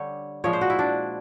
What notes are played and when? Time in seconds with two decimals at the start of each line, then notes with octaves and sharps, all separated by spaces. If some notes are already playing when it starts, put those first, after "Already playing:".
Already playing: D3 G3 C#5
0.44 A#2 F3 G#3 C#5
0.53 C5
0.61 F#4
0.70 E4
0.79 D4